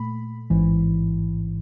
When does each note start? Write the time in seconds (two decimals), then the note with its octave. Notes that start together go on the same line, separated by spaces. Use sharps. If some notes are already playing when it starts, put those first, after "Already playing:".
Already playing: A#2 A3 B5
0.50 A1 G#2 E3